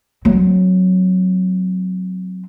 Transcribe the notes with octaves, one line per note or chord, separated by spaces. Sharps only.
F#3 C4